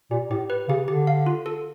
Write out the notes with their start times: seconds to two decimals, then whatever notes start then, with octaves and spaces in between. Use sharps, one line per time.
0.11 A#2 G4
0.30 A2 G4
0.50 B4
0.68 C#3 G4
0.88 D3 G4
1.07 F5
1.26 F4
1.46 A4